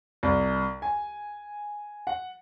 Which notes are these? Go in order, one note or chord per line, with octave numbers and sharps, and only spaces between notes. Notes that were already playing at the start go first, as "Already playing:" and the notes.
C2
G#5
F#5